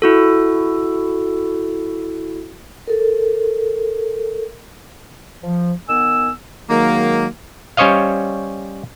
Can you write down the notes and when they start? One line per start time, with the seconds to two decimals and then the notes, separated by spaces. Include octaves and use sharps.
0.02 E4 F#4 A4
2.88 A4 A#4
5.43 F3
5.88 D#3 B3 G#5 E6
6.70 D#3 F#3 G#3 A#3
7.77 G3 C#4 C5 C#5 D#5 F5